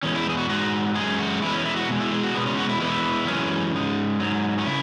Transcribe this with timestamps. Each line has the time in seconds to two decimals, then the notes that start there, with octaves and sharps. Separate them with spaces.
0.03 E2 E3 G#3 C#4
0.15 E4
0.29 G#4
0.37 F#4
0.49 G#2 G#3 F#4
0.95 F#2 C#3 G#3 G#4
1.19 F#4
1.42 E2 E3 G#3 E4
1.54 C#4
1.65 E4
1.76 F#4
1.88 B2 G#3
2.00 E4
2.11 G#4
2.23 F#4
2.34 B2 G#3 B3
2.46 C#4
2.57 F#4
2.69 E4
2.80 E2 E3 G#3 E4
3.27 F#2 E3 G#3 C#4
3.73 G#2 G#3
4.19 G#2 F#3
4.58 C#4
4.66 C#3 E4